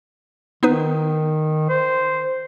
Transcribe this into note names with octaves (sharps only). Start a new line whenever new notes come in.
D#3 B3 D#4 B4
C5